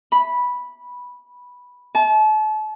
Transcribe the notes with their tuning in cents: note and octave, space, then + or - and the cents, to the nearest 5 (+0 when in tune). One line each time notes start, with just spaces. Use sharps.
B5 -10
A5 -35